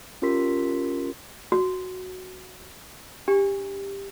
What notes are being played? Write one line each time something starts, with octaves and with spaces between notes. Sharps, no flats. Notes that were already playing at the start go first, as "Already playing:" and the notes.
C#4 F4 G4 A#4 C6 B6
F#4
D4 G4